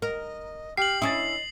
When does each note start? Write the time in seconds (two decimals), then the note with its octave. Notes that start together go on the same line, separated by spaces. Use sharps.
0.02 A#4 D#5
0.77 G4 F6 C7 F#7
1.02 C#4 E4 D#5 D#6 A6